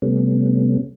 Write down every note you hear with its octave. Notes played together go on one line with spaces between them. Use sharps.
C3 G3 A3 B3 C#4